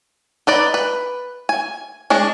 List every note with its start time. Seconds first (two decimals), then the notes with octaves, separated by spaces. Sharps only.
0.47 D#4 B4 D5
0.74 B4
1.49 G#5
2.10 G#3 D4 G#4